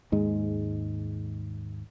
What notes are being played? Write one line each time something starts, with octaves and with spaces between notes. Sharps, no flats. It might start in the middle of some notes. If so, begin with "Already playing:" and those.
D#2 G#2 G#3